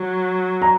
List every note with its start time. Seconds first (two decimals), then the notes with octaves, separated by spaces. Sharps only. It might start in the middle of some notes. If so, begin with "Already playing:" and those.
Already playing: F#3
0.62 A#5